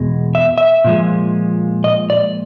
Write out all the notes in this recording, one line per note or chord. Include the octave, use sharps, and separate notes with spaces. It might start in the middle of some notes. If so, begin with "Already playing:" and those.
Already playing: E2 B2 G#3
E5
E5
A#2 F3 G#3
D#5
D5